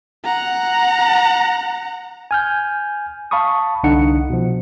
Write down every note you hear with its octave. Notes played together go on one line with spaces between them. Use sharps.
F#5 A#5
G#5 F6 G6
F5 A5 B5 C#6 D#6
C2 D3 D4 D#4 F#5 C#7
B2 F3